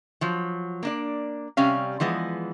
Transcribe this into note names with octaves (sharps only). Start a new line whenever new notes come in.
F3 F#3
A#3 D4 D5
C3 G3 C#4 F5
E3 F3 G#3 B3